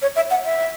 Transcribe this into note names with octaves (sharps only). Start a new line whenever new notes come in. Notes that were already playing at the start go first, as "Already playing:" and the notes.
C#5
E5
F#5
E5